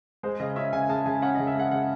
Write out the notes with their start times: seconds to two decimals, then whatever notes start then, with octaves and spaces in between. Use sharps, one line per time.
0.23 G#3 C5
0.40 C#3 D#5
0.56 C#4 E5
0.73 C#3 G#5
0.89 G#3 A5
1.06 C#3 G#5
1.22 C#4 F#5
1.35 D#5
1.39 C#3
1.47 E5
1.55 G#3 F#5
1.71 C#3 F#5